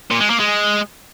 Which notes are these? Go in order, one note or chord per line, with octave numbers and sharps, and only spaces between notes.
A#2
G#3
A#3
G#3